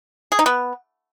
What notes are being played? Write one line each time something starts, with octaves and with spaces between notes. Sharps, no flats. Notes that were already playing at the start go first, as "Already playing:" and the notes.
G#4
D#4
B3